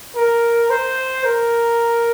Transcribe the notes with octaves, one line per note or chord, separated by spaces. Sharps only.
A#4
C5
A#4